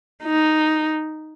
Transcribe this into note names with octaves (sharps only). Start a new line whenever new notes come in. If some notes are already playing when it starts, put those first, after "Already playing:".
D#4